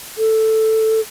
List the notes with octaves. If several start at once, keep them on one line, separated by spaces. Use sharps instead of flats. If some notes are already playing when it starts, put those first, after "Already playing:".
A4